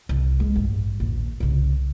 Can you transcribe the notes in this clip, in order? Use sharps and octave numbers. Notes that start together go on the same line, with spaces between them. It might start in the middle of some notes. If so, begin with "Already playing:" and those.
C2
G#3
A1 G2
A#1 D#2
C2 C#3